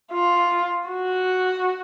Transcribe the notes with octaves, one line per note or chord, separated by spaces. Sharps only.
F4
F#4